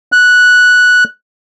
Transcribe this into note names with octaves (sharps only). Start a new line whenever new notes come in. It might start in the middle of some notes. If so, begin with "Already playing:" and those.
F#6